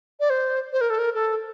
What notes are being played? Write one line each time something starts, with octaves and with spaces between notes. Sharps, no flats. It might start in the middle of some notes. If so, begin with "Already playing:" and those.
D5
C5
C5
A#4
A4
A#4
A4